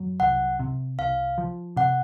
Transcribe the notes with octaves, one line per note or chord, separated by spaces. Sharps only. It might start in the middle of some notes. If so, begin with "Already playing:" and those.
Already playing: F#2 F#3
C2 F#5
C3
C2 F5
F3
C3 F#5